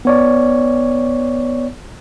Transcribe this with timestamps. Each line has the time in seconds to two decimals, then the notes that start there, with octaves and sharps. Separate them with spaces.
0.05 B3 C#5 D5